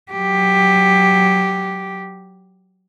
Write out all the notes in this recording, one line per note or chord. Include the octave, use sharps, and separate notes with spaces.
F#3 G4